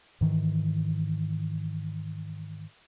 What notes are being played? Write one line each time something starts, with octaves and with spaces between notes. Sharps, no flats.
G#2 D#3 E3